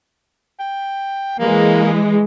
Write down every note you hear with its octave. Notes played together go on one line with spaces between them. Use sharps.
G5
E3 G#3 A#3